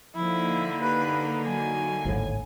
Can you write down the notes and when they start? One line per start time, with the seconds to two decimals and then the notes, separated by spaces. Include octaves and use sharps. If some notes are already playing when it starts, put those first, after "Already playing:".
0.15 D3 F3 A#3 D#4 E4
0.82 G4 B4
1.46 F#3 G#5
2.05 G#1 D2 A2